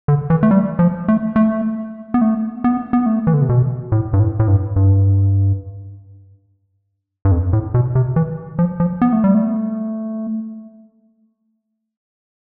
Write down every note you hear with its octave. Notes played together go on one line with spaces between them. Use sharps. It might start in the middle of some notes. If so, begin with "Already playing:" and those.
D3
E3
A3
G3
F3
A3
A3
B3
A3
B3
B3
A3
E3
D3
C3
B2
A2
G2
A2
A2
G2
G2
G2
F2
A2
B2
C3
E3
F3
F3
B3
A3
G3
A3